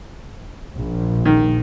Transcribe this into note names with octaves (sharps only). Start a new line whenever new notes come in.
A#1
D#3